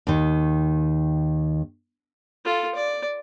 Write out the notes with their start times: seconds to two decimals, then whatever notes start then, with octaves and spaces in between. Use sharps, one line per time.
0.07 D#2 D#3
2.45 F4 A4
2.75 D5